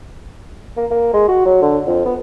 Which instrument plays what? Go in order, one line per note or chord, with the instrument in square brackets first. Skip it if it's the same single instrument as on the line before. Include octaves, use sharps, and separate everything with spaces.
[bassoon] A#3
A#3
G#3
F#4
F#3
D3
F2
B3